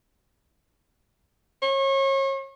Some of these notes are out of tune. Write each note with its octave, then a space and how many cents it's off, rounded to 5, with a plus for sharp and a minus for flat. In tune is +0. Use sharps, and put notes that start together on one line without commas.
C#5 -35